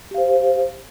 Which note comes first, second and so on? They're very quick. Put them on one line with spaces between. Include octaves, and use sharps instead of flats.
G4 F5 C5